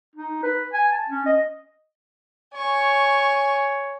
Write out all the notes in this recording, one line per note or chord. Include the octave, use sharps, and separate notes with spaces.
D#4
B4
G#5
A5
C#4
D#5
C#5 G#5 C#6